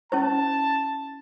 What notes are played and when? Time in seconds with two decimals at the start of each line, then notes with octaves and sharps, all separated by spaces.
0.12 C#4 E4 C5 A5